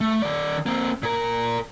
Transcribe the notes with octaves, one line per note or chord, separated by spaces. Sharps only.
A3
D#3 D5
A#3 C4
A#2 A#4